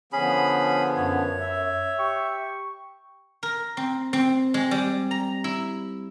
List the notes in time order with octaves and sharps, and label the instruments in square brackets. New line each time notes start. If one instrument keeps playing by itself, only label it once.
[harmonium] D3 F3 B3 [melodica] C#4 G#4 B5
[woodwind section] F#2 [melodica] C#5
[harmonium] E5
[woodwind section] G4 G5 C#6
[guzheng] A#4
C4
C4
G#3
G3
A#5
E4